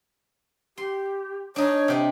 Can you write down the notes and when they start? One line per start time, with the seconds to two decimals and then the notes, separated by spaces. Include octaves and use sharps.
0.78 G4 C6
1.56 D4 D#4 C#5
1.88 C3 G4 D5